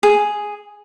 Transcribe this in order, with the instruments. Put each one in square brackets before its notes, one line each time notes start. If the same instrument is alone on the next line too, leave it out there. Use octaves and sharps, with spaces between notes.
[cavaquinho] G#4